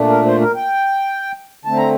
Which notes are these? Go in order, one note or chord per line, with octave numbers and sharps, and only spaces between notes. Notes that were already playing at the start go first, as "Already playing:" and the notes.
Already playing: A#2 A3 D4
A#4
C5
A#4
G5
D3 A3 C4 A5
A#5